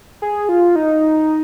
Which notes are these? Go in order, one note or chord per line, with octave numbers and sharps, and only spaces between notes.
G#4
F4
D#4